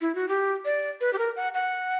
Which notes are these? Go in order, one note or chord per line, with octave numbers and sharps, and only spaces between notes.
E4
F#4
G4
D5
B4
G4
A#4
F#5
F#5